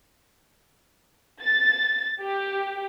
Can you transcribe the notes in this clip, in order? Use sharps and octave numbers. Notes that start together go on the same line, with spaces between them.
A6
G4